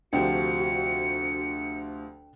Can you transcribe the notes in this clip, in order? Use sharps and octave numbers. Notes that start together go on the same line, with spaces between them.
D2 C3 F3 D4 F#4 G5 C#7